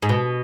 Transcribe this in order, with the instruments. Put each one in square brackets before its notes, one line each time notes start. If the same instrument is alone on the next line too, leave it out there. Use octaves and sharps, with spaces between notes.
[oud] G#2
B2